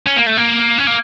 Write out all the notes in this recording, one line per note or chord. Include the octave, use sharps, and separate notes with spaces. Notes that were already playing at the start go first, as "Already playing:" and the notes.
C#4
A#3
A3
A#3
C#4
A#3